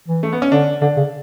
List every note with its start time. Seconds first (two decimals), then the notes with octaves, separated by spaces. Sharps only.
0.08 E3
0.23 A3
0.33 B3
0.42 C#4
0.52 D3 D4
0.82 D3 D4
0.97 C#3